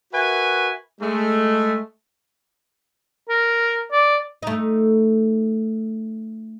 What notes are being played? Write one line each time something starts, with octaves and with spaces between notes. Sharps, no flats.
F#4 A#4 B4 E5 G#5
G#3 A3
A#4
D5
A3 D#4